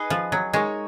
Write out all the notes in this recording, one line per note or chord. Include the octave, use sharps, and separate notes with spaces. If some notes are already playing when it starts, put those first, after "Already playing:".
Already playing: D#4 G#4 B4 D#5
F3
F#3
G#3 D#4 A#4 C#5